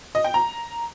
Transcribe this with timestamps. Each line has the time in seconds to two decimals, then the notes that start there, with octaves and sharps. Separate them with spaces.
0.15 D#5
0.24 G5
0.34 A#5